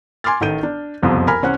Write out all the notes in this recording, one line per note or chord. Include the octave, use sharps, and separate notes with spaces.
G#5 C6 D6 F6 A6
A1 D#3 A4 G6 D#7
D4
F#1 C2 F2 B2 F3
A#4 G#5 B5 F6
C2 C#4 C5 F#5 F#6